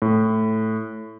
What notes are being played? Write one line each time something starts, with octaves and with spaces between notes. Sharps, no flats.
A2